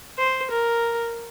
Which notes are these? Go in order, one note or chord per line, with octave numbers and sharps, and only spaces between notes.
C5
A#4